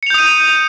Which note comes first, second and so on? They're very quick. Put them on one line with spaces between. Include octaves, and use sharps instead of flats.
C#7 F7 G6 D#6 D#7